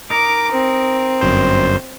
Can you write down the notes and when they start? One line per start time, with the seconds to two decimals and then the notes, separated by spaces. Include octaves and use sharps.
0.10 D#4 A#4 D6
0.52 C4
1.21 G1 F#2 C5